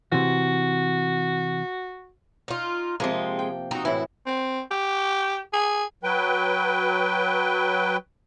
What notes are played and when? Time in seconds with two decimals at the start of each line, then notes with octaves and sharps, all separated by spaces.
0.12 C3 E3 F#4
2.48 D#4 F4
3.00 C3 F3 G#3 A#3 C4
3.39 G5
3.71 C4 D#4 F#4
3.85 A2 E3 E4
4.26 C4
4.71 G4
5.53 G#4
6.03 F#3 B4 G5